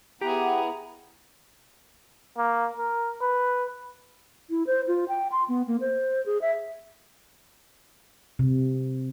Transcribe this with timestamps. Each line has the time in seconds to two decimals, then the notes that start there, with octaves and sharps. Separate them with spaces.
0.21 B3 E4 G4 G#4 F#5 A#5
2.38 A#3
2.77 A#4
3.21 B4
4.50 E4
4.67 C5
4.88 F4
5.08 G5
5.32 C6
5.48 B3
5.68 A#3
5.81 C5
6.26 G#4
6.41 E5
8.39 C3